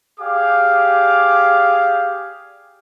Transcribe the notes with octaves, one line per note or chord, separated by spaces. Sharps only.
G4 G#4 D5 F5 D6